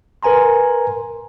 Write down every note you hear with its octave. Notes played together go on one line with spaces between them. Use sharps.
A#4 B4 G#5 A#5 C6